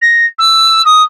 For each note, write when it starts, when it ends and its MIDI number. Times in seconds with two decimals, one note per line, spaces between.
0.02 0.26 94
0.39 0.82 88
0.85 1.03 87